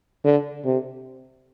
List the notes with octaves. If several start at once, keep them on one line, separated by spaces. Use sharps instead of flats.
D3
C3